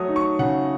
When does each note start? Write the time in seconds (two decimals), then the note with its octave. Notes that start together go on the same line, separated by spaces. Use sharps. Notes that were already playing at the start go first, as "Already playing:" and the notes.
Already playing: F#3 A3 D#6
0.08 D#4
0.16 C#6
0.39 C#3 F#5